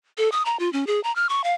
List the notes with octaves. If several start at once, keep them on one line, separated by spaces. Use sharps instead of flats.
A4
D#6
A#5
F4
C#4
G#4
A#5
F6
C#6
F5